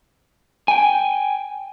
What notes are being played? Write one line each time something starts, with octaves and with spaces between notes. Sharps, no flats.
G5 G#5